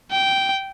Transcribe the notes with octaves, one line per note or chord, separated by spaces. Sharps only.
G5